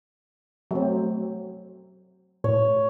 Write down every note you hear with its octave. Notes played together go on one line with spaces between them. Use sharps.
F#3 A3 C4
A2 C#5